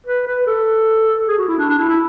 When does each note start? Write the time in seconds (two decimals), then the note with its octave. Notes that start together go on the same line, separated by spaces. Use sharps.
0.06 B4
0.27 B4
0.47 A4
1.28 G#4
1.38 F#4
1.48 E4
1.58 D4
1.69 D4
1.78 E4
1.88 E4